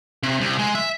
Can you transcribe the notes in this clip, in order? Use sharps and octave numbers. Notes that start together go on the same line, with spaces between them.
C3
C2
G#3
E5